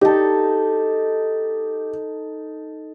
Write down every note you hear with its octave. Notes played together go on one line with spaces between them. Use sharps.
D#4 G4 A4